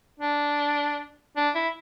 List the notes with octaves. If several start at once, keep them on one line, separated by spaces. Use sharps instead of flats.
D4
D4
E4